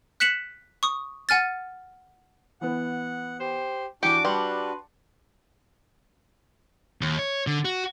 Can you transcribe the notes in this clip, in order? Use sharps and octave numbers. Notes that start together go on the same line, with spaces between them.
F#6 B6 C#7 E7 F#7
C#6 D#6
F#5 G#5 F6 A6
E3 B3 F#5
G4 C5
E3 D4 F#4 G4 D6 C#7
G3 B4 A5 C6
D#2
C#5
D3
F#4